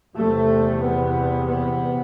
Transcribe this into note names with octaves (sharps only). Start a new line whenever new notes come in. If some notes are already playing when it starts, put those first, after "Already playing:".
E2 C3 A3
B3
B3